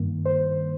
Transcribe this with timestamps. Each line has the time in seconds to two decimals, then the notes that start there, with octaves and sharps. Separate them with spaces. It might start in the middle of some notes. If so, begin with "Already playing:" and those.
Already playing: G2 D#3 A#3
0.25 C5